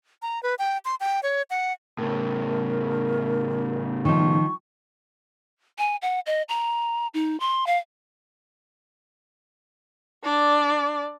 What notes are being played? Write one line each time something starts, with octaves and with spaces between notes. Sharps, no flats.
A#5
B4
G5
C6
G5
C#5
F#5
A2 C#3 A#4
D#3 F3 C#6
G#5
F#5
D#5
A#5
D#4
C6
F5
D4 D5